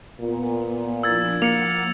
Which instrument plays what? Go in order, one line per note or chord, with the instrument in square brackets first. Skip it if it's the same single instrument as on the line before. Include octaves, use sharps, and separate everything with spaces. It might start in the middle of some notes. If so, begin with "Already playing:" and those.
[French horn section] A#2 [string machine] B3
[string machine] F3 D4 E4 [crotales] E6 G#6 A6
[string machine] F3 F#5 A6 [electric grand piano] A#3 [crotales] C#7 F7